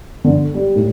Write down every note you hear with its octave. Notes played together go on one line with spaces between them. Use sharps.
D3
G3
A2